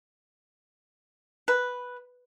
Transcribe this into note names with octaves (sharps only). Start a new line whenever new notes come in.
B4